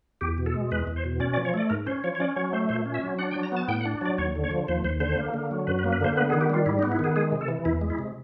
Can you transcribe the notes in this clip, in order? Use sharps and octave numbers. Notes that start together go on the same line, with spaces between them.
E2 G4
B2
A4
G#3
E2 B4
E2
C5
B2
C#4 D5
D5
F3
C#5
A3 D5
G#2 A#4
C#4 C5
F3 C#5
C#5
C#4 D5
F#3 C#5
A3 C5
A#2 C5
C#4
E5
F#3
D4 F#5
G5
F#3
A#5
B3 A5
A2 G5
F#5
D4
F#3 D5
D#2 C#5
D3
C#5
F3
D#2 C5
D#2 C5
D3 C5
A#3
D3
F#3
F#2 B4
B4
A#3
B4
D3 C5
B3 B4
G#4
D#3
G4
G3 F4
G#2 E4
D#4
B3
E4
D#3 G#4
G#3 G#4
C3
A4
E3
E2 E4
G#3
E4
C3